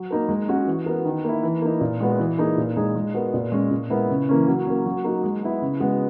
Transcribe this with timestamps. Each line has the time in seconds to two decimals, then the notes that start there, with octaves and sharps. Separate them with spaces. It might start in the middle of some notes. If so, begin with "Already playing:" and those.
Already playing: F#3
0.10 A#3 D#4 A#4
0.29 G#3
0.48 C#4 F#4
0.67 E3
0.86 B3 F#4 A#4
1.05 D#3
1.24 A#3 E4
1.43 E3
1.62 A#3 D#4
1.81 A#2
2.00 G#3 B3 F#4
2.19 E3
2.38 A#3 D#4 G#4
2.57 A#2
2.77 G#3 D#4 G#4
2.95 G#3
3.14 B3 F#4 A#4
3.34 A#2
3.52 G#3 C#4
3.71 A#2
3.90 G#3 B3 E4 A#4
4.10 C#3
4.29 E3 A#3 C#4
4.48 F#3
4.67 A#3 C#4
4.86 F#3
5.04 A#3 D#4 F#4
5.24 G#3
5.43 B3 E4
5.62 C#3
5.80 G#3 B3 F#4